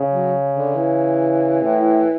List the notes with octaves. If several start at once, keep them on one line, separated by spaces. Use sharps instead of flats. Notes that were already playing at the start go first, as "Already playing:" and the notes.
Already playing: C#3
F#3
D3
E3
A2